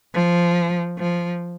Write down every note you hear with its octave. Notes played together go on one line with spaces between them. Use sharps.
F3
F3